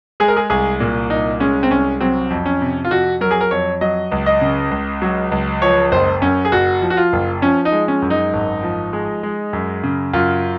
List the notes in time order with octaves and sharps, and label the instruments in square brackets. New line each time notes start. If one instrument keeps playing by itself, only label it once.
[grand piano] G#3 G#4
A#4
G#4
C2 G#4
A#2
C2 D#4
G#3 C#4
C4
C2 C#4
F#3 C4
F2
C#4
C3
F4
F2 F#4
F#3 A#4
G#4
A#4
F2 C#5
F#3 D#5
C#2
D#5
C#3
C#2
F#3
C#2
F3 C#5
F#1 C5
F#2 C#4
G#4
F#1 F#4
F3
F#4
F4
F#1
F3 C#4
D#4
G#3
C#4
F#2
D#4
G#1
F3
G#3
G#3
F#2
C#3
F#2 F4